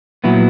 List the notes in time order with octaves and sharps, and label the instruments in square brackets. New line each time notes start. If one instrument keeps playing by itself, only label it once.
[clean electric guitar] A#2 F#3 B3 E4